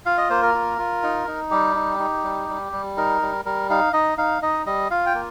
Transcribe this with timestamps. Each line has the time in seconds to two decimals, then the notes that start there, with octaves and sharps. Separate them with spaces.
0.06 F4 F5
0.18 D#5
0.30 A#3 C5
0.42 A#4
0.54 F4
0.78 F4
1.03 D#4
1.28 D#4
1.51 G3 G4
1.76 D#4
1.99 D#4
2.24 G3
2.49 G3
2.72 G3
2.97 D#4 A#4
3.22 G3
3.45 G3 A#4
3.70 D#4 F5
3.93 D#4 D#5
4.18 D#4 F5
4.42 D#4 D#5
4.66 G3 D#5
4.91 F4 F5
5.06 G5
5.14 A#3